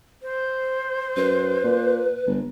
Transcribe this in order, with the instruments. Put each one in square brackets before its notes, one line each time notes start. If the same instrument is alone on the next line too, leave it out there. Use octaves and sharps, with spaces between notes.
[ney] C5
[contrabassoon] F#2 [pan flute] B4
[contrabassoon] A#2
G1